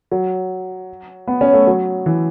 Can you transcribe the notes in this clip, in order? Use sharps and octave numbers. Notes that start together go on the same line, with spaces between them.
F#3
B3
C#4
A3
F#3
E3